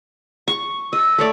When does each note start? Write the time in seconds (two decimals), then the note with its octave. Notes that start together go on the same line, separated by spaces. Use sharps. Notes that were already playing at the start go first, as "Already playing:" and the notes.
0.48 C#6
0.93 D#5 E6
1.18 A3 C#5 D5